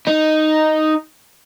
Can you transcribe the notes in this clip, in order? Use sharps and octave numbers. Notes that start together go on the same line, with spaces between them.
D#4